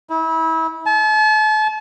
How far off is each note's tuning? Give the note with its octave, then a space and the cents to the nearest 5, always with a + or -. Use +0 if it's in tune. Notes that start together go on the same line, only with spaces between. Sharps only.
E4 -30
A5 -40